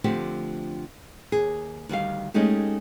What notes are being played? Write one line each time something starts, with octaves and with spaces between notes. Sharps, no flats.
D3 F3 A3 C4 G4
D#2 G#4
D2 D#3 G3 F5
G#3 A3 C#4 D#4 G4